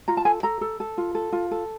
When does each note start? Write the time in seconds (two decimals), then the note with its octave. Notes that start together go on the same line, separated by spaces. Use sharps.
0.08 F4 A#5
0.17 A5
0.25 A4 G#5
0.43 A4 A#5
0.61 A4
0.80 A4
0.98 F4
1.15 A4
1.32 F4
1.51 A4